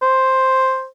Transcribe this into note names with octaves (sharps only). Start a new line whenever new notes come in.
C5